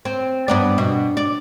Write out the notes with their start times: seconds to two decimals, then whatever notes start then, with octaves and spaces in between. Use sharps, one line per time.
0.05 C4
0.48 G2 B3 D5
0.78 B2
1.17 D5